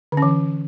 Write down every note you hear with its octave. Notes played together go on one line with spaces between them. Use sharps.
D3
C#4
E3